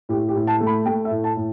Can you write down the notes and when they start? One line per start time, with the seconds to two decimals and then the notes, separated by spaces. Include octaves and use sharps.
0.09 A2 G4
0.29 G4
0.35 A2
0.47 A5
0.61 A3
0.67 B5
0.85 A3 G5
1.05 E5
1.11 A2
1.24 A5
1.37 A2